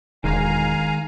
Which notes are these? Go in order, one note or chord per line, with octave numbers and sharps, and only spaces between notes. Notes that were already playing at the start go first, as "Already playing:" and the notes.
E1 D#3 G#3 F5 G#5 A#5